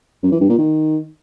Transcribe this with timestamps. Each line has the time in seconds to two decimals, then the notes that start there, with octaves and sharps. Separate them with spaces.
0.23 F#2
0.32 E3
0.41 G2
0.49 A#2
0.58 D#3